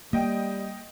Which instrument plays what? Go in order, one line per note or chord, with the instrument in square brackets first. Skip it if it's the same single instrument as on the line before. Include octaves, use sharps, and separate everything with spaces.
[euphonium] G3 [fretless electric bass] A#3 [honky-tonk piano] D#5 G5